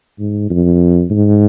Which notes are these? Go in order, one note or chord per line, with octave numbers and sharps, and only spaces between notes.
G#2
F2
G#2